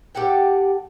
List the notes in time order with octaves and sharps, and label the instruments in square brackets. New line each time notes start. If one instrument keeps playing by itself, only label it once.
[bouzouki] G4 A4 F#5 G5